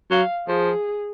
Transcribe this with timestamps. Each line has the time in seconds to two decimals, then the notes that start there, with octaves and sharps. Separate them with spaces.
0.11 F#3 F5
0.48 F3 G#4